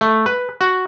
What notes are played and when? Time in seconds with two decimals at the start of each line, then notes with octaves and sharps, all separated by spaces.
0.01 A3
0.26 B4
0.61 F#4